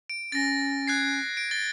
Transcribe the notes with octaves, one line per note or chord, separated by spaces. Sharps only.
D7
C#4 A6 A#6
F#6 G#6 C7
D7
A6 G7